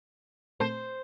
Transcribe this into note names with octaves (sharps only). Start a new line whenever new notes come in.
A#2 A3 C4 C5